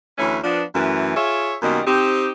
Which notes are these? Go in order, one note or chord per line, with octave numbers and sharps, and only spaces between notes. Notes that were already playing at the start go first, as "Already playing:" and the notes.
D2 E3 A3 C#4 C#5
F3 B3 D4
F#2 E3 A3
F4 G#4 C#5 E5
F#2 B2 D#3 G3 A#3 D#5
C4 D#4 G4